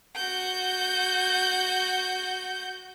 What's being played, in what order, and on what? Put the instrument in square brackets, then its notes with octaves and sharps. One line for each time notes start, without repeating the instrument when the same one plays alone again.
[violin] F#4 G6